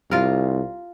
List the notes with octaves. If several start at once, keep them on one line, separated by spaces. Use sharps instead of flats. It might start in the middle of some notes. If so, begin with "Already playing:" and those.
C2 F4 A#4